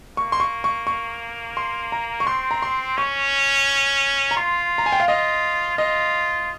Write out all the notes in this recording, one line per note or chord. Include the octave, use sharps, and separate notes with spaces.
A#3 C#6
C6
C#6
C#6
C#6
C6
A#5
C#6
C4 C6
A#5
C6
C#4 C#6
A#5
F4 C6
A#5
G#5
G5
F5
F4 D#5
F4 D#5